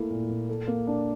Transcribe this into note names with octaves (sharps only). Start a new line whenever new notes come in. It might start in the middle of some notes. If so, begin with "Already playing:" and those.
Already playing: A3 A#3 E4
A#2
A#2
A4
A#3
D4